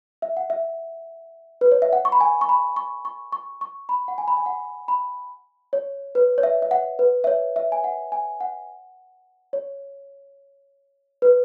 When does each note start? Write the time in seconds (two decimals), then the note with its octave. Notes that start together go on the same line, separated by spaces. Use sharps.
0.22 E5
0.37 F#5
0.50 E5
1.61 B4
1.72 C#5
1.82 E5
1.93 F#5
2.05 C#6
2.12 B5
2.21 G#5
2.41 C#6
2.49 B5
2.76 C#6
3.05 C#6
3.33 C#6
3.61 C#6
3.89 B5
4.08 F#5
4.18 G#5
4.28 B5
4.37 G#5
4.46 F#5
4.88 B5
5.73 C#5
6.15 B4
6.38 C#5
6.43 E5
6.62 E5
6.71 F#5
6.99 B4
7.24 E5
7.27 C#5
7.56 E5
7.72 G#5
7.84 F#5
8.12 G#5
8.41 F#5
9.53 C#5
11.22 B4